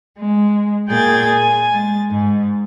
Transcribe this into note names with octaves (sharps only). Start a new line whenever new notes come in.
G#3
A#2 G#4 G5 G#6 A6
G#5
G#3 A6
G#2